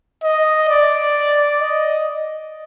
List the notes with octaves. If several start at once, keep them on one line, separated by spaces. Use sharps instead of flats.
D#5
D5
D#5